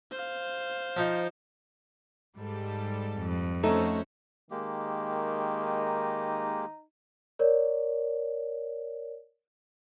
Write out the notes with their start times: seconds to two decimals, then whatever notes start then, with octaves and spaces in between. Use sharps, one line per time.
0.12 C5 F5
0.97 F3 D#4
2.37 G#2 G3 A4
3.19 F2
3.64 A3 C#4 D#4 F#4 A4 C5
4.51 D#3 G#3 A#3 G4
5.65 D#4
7.39 A#4 C#5 D5